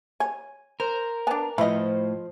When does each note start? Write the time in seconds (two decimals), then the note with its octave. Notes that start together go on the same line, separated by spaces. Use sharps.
0.20 C#5 G#5
0.80 A#4 C5
1.27 B3 D4 G#5 A5
1.58 A2 F3 E4 B4 C5 D#5